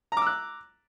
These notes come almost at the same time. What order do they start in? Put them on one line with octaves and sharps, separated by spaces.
A#5 D6 E6 F#6